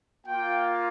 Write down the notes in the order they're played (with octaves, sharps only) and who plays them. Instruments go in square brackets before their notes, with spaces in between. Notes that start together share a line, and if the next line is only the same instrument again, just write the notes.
[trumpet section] A#3 F4 G5